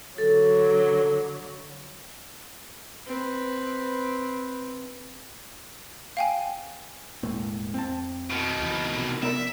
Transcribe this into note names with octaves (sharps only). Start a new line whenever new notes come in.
D3 F#3 A4
C4 B4
F5 G5 G#5
E1 A2 G#3 A#3
F2 C4 A5
B2 D#3
C#2 E3
C3 F3
B3 A#4 D5 E5